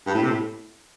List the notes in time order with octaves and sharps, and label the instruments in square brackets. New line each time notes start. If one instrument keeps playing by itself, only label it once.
[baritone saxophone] G2
A2
C3
A2